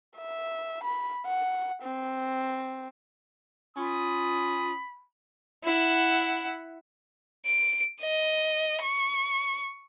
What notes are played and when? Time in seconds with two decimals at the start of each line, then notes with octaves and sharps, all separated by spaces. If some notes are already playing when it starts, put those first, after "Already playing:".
0.18 E5
0.84 B5
1.26 F#5
1.83 C4
3.76 C#4 F4 B5 D#6
5.64 E4 F#5
7.46 D7
8.01 D#5
8.83 C#6